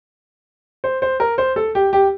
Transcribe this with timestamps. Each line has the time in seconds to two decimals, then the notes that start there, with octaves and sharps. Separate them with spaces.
0.84 C5
1.02 C5
1.20 A#4
1.38 C5
1.56 A4
1.75 G4
1.93 G4